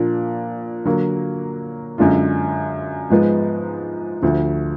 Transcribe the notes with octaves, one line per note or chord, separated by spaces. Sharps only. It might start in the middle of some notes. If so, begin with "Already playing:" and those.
Already playing: A#2 F3 A#3 D4
D3 F#3 A#3
F#2 D3 G#3 D4 F4
G#2 F3 G#3 B3
D2 D3 F3